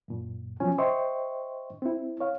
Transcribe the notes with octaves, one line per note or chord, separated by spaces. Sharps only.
F#2 A#2
B2 F3 F#3 C#4 G#5
C5 D#5 E5 G5 C6 C#6
C4 E4
C#5 F5